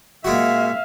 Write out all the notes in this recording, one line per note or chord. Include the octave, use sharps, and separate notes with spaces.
A#2 G#3 F#4 E5 F5